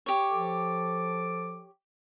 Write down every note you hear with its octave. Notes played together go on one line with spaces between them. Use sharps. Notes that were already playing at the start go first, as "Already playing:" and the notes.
G4 C#5
F3 A4 D6